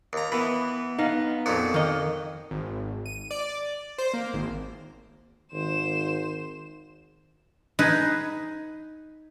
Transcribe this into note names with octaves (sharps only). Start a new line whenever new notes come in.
D#2 A#5
E3 B3 B5
B3 D#4 F5
F2 A#2 F#4
D#3 D#5
G#1
D#7
D5
C5
A#3
G#1
G#1 D#3 C5 E7
D#4 G#4 B4